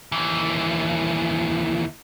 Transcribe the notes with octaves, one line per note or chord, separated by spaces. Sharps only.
D#2 E3